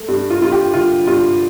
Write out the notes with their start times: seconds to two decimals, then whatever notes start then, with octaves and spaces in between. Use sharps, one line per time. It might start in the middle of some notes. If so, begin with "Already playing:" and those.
Already playing: A3
0.08 G2
0.30 F4
0.41 G2 F4
0.52 G4
0.74 D3 F4
1.07 G2 F4